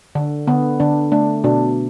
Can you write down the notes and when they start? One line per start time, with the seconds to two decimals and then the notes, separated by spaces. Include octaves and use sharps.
0.15 D3
0.47 D3 B3
0.80 D3 D4
1.12 A3 D4
1.44 B2 D4